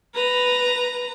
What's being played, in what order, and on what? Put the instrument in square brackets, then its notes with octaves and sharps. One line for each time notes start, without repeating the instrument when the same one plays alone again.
[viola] B4 A#5